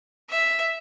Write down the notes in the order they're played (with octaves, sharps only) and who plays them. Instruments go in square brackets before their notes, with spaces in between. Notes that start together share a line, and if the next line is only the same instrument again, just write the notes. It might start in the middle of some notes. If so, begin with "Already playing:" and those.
[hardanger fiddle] E5